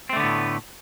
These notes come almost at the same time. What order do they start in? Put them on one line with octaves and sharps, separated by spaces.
C4 A3 D3 B3 A2